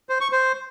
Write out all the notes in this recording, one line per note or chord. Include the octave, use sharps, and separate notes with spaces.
C5
C#6
C5